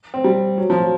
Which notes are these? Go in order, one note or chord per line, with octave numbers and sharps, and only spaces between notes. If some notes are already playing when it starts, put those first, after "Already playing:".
C4
G3
F#3
F3
F#3